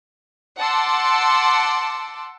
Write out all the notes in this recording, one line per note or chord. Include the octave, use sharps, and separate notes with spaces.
F#5 A5 C6 D6 E6